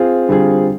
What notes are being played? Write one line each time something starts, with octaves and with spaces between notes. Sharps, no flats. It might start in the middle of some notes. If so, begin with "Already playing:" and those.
Already playing: C4 F4 G#4
D3 G3 C4 F4 G#4